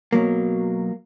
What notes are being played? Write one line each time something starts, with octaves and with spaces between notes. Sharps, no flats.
B2 F#3 A#3